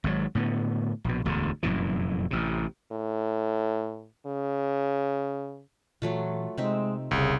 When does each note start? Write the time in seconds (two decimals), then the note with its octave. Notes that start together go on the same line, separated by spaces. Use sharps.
0.04 G#1 G#2 B2 F#3
0.35 A2 D3 B3
1.04 A#1 B2
1.25 E1 D2 G#2 D3
1.63 F1 F#2 A#2 E3
2.31 A1 C3
2.92 A2
4.26 C#3
6.02 A#2 E3 F#3 A3 F4
6.57 C3 G#3 C4 D#4 E5
7.11 E1 C2 C#3